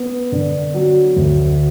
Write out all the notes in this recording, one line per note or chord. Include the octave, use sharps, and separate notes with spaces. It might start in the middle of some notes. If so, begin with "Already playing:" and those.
Already playing: B3
D3
F#3
D2